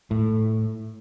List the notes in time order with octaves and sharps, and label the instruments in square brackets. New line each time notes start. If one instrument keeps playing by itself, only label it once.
[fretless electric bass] A2